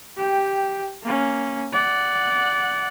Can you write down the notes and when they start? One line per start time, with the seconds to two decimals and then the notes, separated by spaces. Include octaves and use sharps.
0.17 G4 G5
1.03 A#3 C#4
1.73 D5 F#5